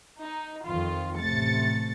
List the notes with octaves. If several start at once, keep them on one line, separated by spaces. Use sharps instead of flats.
D#4
F2 D#3 F4
A1 C3 A3 A6 C#7